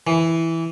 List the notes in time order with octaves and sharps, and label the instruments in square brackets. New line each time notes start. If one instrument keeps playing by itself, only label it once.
[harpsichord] E3